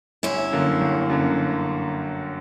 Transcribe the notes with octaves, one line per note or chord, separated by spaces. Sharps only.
G1 C#4 E4
F#2 D3 A#3
G1
F#2 D3 A#3